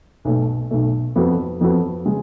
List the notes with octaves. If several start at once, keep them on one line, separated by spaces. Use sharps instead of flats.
B1 B2 A3
B1 B2 A3
F2 F3 B3 F#4 A4
F2 F3 B3 F#4 A4
C#3 G#3